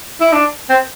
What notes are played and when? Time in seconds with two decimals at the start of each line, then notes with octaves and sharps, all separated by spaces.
0.20 E4
0.32 D4
0.69 C4